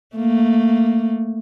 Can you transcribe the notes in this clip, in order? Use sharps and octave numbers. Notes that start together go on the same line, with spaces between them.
A3 A#3